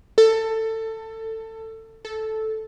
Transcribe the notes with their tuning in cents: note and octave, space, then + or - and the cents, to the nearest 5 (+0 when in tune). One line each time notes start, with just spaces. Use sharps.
A4 +20
A4 -5